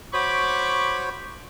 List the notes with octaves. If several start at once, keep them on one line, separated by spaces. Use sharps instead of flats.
F#4 C5 C#5 B5 C#6 D6